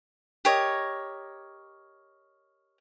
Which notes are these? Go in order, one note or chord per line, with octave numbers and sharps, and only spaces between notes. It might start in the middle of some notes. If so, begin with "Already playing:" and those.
G4 A#4 C#5 D#5